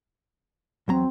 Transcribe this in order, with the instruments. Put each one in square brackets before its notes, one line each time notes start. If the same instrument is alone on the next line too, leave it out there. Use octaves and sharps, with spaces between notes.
[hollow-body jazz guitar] E2 F#3 A#5 [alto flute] C4